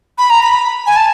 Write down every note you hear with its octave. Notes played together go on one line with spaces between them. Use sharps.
B5
A#5
B5
G#5
A5